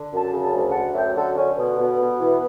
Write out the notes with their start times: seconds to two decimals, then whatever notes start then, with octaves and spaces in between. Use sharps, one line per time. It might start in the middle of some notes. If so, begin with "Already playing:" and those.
Already playing: D3
0.12 F#2 A5
0.32 C#3
0.44 A5
0.53 D2
0.71 D2 F#5 A5
0.94 F#2 E5 G5
1.16 D3 F#4 A4
1.36 D3 C#4
1.56 B2 B3
1.77 B2
1.98 B2
2.19 E3